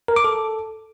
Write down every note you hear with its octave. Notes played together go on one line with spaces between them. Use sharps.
A#4
D6
A4